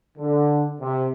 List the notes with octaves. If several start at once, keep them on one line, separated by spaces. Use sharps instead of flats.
D3
C3